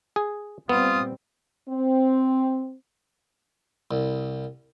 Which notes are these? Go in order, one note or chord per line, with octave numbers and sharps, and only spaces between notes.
G#4
A#2 G3 B3 C4 F4 D#6
C4
C2